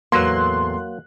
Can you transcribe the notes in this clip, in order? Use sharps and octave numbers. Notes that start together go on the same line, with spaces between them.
E2 A2 F#3 A#3 C6 F#6